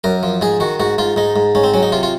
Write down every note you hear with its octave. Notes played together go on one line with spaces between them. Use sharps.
F#2 A#4
F3
G#2 G#4
D#3 F#4
G#2 F#4
G#2 F4
G#2 D#4
G#2
G#2 C#4
C4
F#3 C#4
D#4
C3 F4
F4